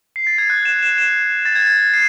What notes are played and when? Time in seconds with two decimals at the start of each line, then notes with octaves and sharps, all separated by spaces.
0.16 C7
0.27 A6
0.38 G#6
0.50 F#6
0.65 E7
0.83 E7
0.98 E7
1.46 A6
1.56 G#6
1.66 A6
1.94 C7